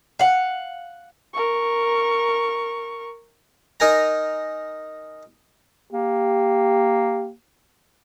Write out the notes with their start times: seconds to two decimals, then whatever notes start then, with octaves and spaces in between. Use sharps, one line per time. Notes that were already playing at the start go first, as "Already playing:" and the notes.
0.19 F5 F#5
1.34 A#4 C#6
3.80 D#4 A#4 G#5 A#5
5.92 A#3 G4